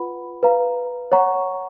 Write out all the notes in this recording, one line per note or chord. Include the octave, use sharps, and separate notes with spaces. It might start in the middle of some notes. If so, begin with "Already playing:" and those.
Already playing: F4 B4 F#5 B5
B4 F5 A#5
C#5 F#5 A#5 C#6